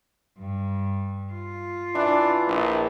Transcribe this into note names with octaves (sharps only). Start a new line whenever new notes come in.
G2
F4
E3 D4
A#1